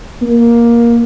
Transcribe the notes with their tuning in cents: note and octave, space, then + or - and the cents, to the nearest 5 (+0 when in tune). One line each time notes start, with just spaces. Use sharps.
A#3 +10